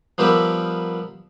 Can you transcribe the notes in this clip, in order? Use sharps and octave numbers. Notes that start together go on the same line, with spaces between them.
F3 G3 B3 G4 A#4 E5